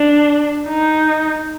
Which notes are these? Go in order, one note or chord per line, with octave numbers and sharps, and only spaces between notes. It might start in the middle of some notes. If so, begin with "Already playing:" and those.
Already playing: D4
D#4